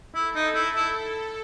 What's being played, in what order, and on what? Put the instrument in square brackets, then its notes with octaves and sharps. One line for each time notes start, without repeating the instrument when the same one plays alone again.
[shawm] E4 [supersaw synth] A4
[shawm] D#4
E4
E4